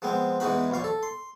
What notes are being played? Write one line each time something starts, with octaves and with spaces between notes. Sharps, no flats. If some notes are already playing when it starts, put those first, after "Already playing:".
F3 G#3 B3 C4
E2 E3 G#3 D#4 F#4 B5
A#1 D#2 A#2 F5 C#6
A4
C6